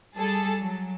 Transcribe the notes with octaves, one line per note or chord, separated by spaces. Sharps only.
G3 G#4 A4 A5
F#3